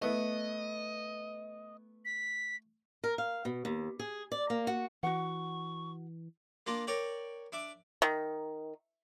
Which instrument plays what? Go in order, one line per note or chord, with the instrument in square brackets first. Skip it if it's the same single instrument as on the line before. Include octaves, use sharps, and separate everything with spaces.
[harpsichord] A3 [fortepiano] B3 E4 [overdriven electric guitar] D#5
[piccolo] B6
[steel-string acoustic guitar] A#4
F5
B2
D#2
G#4
D5
A#3
F#4
[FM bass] E3 [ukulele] F#4 F#5 [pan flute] C#6
[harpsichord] A#3 D4 F4
A#4 C#5 D5 G5
D4 E5 D6
[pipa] D#3